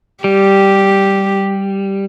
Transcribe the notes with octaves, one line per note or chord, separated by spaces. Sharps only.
G3 G4